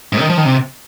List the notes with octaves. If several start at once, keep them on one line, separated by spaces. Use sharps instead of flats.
G#2
D#3
F3
D#3
C3